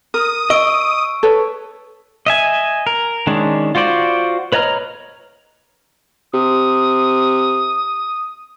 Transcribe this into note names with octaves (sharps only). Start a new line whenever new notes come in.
A#4 D#6
D#5 C#6 E6 D7
A4 B4 C#5
D#5 E5 G#5
A#4
D#3 G#3 C#4 D4
F4 F#4 C5 D5
B4 C#5 D#5 A#5 F6
C3 D#6